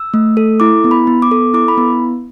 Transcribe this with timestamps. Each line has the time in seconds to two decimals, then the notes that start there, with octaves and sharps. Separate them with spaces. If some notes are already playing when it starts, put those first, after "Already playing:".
Already playing: E6
0.14 A3
0.37 A4
0.60 E4 D6
0.84 B3
0.91 B5
1.07 B3
1.22 D6
1.31 A4
1.54 E4 D6
1.68 B5
1.78 B3